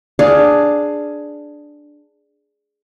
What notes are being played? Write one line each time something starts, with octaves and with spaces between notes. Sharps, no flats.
D4 G#4 F5